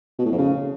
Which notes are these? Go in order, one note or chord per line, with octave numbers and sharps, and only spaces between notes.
B2
A2
F2
C#3